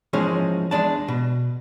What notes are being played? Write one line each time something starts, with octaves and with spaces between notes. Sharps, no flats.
E3 F3 G#3 A#3 C#4 G#4
E2 G#3 D4 A5
B2